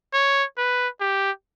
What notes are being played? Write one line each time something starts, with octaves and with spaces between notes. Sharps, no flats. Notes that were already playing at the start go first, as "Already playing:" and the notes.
C#5
B4
G4